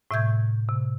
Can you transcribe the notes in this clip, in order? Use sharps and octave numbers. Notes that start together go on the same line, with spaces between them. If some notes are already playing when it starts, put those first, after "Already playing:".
A2 C3 E5 C#6 G6 G#6
C3